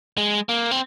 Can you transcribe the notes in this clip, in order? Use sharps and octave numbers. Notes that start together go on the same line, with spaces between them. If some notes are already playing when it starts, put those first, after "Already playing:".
G#3
A#3
C4